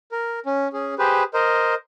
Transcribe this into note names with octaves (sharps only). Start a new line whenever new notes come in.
A#4
C#4
C#4 G#4
G4 G#4 B4 C5
A#4 C5 D#5